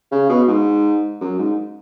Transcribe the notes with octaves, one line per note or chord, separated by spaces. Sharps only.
C#3
B2
G#2
F#2
G#2